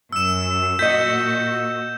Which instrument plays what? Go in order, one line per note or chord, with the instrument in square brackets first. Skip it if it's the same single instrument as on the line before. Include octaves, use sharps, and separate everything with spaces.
[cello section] F#2 [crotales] E6 E7
[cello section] A#2 F#4 [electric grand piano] D#5 B6 [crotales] G6